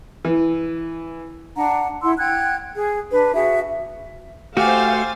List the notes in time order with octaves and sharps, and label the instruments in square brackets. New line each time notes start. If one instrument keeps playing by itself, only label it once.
[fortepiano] E3
[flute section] D4 F#5 A#5
E4 F#5 C6 E6
F#5 G5 F#6 G#6
G#4
D4 B4
F#4 G#4 E5
[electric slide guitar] A3 F#4 [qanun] G4 [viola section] C5 F5 [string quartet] G#5 A6